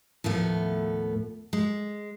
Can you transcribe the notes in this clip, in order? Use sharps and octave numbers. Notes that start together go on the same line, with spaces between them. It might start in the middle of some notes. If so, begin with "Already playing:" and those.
D#2 A2 F3 A3 B3
G#3